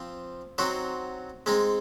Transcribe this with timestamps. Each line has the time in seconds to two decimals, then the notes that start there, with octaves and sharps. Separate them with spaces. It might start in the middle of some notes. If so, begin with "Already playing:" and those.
Already playing: F3 C4
0.58 F#3 C4 D#4 F#4 C5
1.46 G#3 C4 D#4